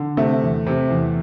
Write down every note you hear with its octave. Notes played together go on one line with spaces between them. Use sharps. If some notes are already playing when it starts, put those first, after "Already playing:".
Already playing: D3
C3 A3
E2
C3
E2